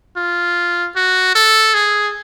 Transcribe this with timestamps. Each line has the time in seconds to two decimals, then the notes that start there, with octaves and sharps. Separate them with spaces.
0.16 F4
0.96 F#4
1.35 A4
1.74 G#4